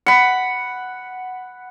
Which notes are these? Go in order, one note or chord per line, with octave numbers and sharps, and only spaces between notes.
F#5 B5